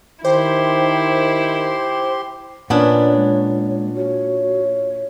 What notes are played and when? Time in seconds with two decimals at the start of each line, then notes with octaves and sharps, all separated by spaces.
0.24 D#3 E4 G4 C5 C6
2.70 A#2 B3 C#4 D4 C#5 D5
3.16 G#3
3.95 F#4 C#5